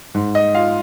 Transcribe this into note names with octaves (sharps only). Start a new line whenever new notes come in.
G#2
D#5
F4 F5